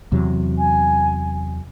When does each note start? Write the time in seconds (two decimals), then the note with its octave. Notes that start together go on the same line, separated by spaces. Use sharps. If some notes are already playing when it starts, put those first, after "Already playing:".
0.12 E2 C3 F#3
0.58 G#5